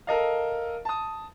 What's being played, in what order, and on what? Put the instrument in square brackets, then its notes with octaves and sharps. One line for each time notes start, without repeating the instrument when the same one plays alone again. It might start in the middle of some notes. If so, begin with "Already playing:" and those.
[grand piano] A4 A#4 D#5 F5
A5 D#6